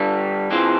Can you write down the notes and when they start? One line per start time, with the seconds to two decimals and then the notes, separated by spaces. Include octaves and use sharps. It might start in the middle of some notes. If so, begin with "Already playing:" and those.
Already playing: G2 D3 G3
0.51 E3 G#3 C4 F4